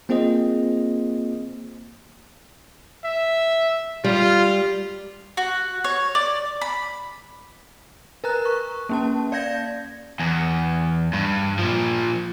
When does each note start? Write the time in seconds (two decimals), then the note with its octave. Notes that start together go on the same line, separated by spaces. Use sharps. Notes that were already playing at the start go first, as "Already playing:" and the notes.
0.09 A#3 C4 F4 G#4 C5 D#5
3.05 E5
4.04 G3 F4
5.37 F#4
5.84 C#5
6.15 D5
6.61 B5
8.24 A#4 B4 A#5 F#6
8.45 C#6
8.89 A#3 C#4 A5
9.32 D5 F5 G6 G#6 A#6
10.20 E2
11.13 G2
11.59 A#2 F3